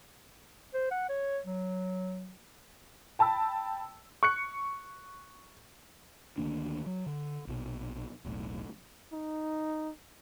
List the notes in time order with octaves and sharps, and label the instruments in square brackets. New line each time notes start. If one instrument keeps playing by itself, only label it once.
[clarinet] C5
F#5
C#5
F#3
[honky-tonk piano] G5 A5 B5 E6
[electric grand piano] C#6 F#6 C#7
[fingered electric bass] D2 D#3 A#3 D4
F#3
D3
A#1 B2
E1 B1 A2
[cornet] D#4